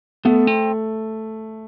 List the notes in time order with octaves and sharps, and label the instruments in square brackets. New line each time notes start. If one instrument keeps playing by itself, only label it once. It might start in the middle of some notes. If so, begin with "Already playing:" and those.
[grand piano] A3 [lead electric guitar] B3
[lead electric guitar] C4